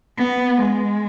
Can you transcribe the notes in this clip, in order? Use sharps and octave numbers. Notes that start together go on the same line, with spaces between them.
B3
G#3